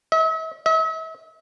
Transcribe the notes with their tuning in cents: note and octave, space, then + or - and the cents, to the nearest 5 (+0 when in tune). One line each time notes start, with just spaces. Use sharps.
E5 -40
E5 -40